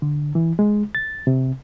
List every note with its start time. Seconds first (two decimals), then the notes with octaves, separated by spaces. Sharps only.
0.02 D3
0.35 E3
0.59 G#3
0.95 A6
1.27 C3